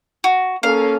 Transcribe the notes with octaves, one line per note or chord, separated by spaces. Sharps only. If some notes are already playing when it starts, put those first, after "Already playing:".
F#4
A#3 C#4 A4 F5